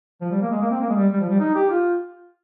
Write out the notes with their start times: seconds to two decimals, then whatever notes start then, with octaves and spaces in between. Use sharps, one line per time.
0.21 F3
0.31 G3
0.42 A#3
0.51 G#3
0.61 A#3
0.71 C4
0.81 A#3
0.89 G#3
0.96 G3
1.13 G3
1.20 F3
1.30 G3
1.40 D#4
1.55 G4
1.70 F4